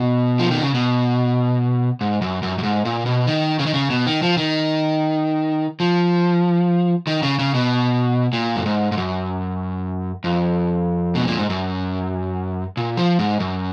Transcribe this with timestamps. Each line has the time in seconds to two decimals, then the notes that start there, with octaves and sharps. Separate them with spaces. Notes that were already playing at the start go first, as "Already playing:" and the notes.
Already playing: B2
0.39 F3
0.51 D#3
0.62 C#3
0.74 B2
2.01 G#2
2.22 F#2
2.43 F#2
2.58 F#2
2.63 G#2
2.85 A#2
3.06 B2
3.27 D#3
3.59 C#3
3.66 D#3
3.74 C#3
3.90 B2
4.07 D#3
4.23 F3
4.37 D#3
5.80 F3
7.07 D#3
7.23 C#3
7.39 C#3
7.54 B2
8.33 A#2
8.56 F#2
8.66 G#2
8.92 G#2
8.97 F#2
10.24 F2
11.15 B2
11.27 A#2
11.39 G#2
11.50 F#2
12.77 A#2
12.97 F3
13.19 G#2
13.40 F#2